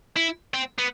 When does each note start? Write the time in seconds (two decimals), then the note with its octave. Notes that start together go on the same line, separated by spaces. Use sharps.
0.17 E4
0.54 C4
0.78 B3